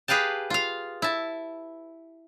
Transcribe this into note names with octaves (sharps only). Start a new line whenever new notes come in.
G4 G#4 B4 F5 G5 A5
F4 F5
E4 A5